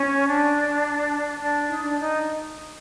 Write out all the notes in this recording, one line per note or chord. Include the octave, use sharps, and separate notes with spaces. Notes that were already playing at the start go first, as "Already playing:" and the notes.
Already playing: C#4
D4
D4
D#4
D4
D#4